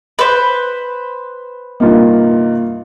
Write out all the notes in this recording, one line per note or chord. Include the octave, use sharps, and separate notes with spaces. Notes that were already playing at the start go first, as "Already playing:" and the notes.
B4 C5
G2 C3 A#3 D#4 F4